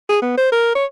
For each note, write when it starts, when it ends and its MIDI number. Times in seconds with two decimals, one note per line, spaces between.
0.09 0.20 68
0.22 0.37 59
0.37 0.51 72
0.52 0.74 70
0.75 0.85 73